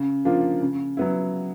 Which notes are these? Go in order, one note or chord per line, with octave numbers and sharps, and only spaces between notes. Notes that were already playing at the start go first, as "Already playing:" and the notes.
Already playing: C#3
F3 A#3 D4 F4
C#3
F#3 B3 E4